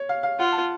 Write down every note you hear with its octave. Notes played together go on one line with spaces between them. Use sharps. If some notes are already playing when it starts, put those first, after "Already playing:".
Already playing: C#5
F5
F5
F4 F#5
A5